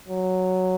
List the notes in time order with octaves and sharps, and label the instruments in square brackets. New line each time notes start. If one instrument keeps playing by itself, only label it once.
[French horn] F#3